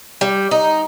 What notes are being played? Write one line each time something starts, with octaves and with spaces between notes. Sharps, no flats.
G3
D#4